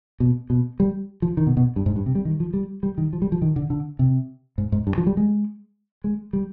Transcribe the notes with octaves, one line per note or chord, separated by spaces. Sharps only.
B2
B2
G3
F3
D#3
B2
B2
G2
G#2
G2
C3
G3
D#3
F3
G3
G3
D#3
F3
G3
F3
D#3
D3
D3
C3
G#2
G#2
G2
F3
G3
G#3
G#3
G3